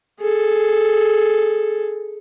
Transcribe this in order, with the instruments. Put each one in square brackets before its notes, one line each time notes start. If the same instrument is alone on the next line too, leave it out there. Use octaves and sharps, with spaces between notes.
[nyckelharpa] G#4 A4